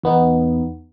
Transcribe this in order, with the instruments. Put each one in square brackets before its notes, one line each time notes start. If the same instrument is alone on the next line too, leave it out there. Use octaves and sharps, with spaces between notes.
[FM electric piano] E2 B3 D#4